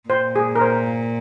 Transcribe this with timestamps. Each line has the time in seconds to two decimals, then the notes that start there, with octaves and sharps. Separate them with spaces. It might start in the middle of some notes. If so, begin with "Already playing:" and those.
0.09 A#2 C5
0.36 G#4
0.56 A#4
0.61 C5